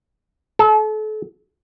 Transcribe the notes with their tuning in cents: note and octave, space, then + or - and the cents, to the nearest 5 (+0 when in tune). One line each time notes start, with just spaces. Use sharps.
A4 -35